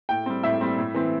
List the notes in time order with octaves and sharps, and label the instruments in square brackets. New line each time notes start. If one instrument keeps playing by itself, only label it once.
[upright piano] A2 G5
G3 C4
A2 E5
G3 C4
A2
E3 C4